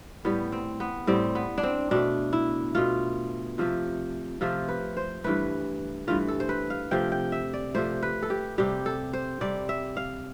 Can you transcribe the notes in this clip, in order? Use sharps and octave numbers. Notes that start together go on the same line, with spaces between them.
A2 G3 B3
C4
B3
A2 G3 C4
B3
D4
C4
B2 A3 D4
E4
B2 A3 F4
C3 F3 A3
C3 F3 A3 F4
B4
C5
G2 E3 A3 B4
G2 E3 A3 F4
A4
C5
B4
F5
C3 F3 A3 G5
G5
E5
D5
C3 F3 A3 C5
B4
A4
G4
C3 G3 G4
A4
C5
C3 G3 D5
E5
F5